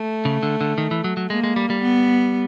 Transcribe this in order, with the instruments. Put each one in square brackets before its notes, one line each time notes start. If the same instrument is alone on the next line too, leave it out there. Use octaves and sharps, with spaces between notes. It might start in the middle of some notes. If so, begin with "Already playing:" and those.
Already playing: [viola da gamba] A3
[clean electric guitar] C#3
D3
D3
D#3
E3
F#3
F#3
[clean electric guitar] G#3 [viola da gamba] A#3
[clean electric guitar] G#3
G3
G3
[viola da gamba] B3